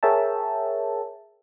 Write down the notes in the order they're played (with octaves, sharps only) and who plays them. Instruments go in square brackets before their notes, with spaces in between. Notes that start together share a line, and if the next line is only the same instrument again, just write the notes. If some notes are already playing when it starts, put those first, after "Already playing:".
[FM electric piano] G#4 A#4 C#5 E5 G5 A5